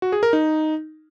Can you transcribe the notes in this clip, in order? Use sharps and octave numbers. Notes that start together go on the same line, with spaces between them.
F#4
G#4
A#4
D#4